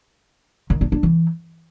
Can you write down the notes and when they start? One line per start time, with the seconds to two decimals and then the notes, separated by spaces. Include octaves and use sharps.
0.70 D#3
0.81 D4
0.92 D4
1.03 E3